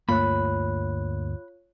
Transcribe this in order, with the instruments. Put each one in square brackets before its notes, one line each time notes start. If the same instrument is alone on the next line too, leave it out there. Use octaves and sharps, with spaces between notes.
[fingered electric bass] D2 G2 A3 [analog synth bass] A#3 [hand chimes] F4 C#5 F#6 [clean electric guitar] B5